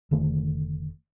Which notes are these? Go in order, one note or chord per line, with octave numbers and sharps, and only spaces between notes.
F1 D3 D#3 A3